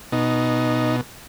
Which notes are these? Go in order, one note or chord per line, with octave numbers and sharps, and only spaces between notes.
B2 D#4